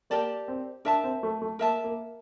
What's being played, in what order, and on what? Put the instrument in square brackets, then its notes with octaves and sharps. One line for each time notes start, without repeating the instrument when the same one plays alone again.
[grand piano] A#3 [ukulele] G4 A#4 D5 A5
[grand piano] C4
[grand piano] D4 [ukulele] A#4 E5 A5
[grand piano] C4
A3
A3
[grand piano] A#3 [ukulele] A#4 E5 A5
[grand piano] A#3